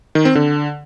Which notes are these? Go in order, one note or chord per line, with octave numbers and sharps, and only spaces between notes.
D#3
C4
D3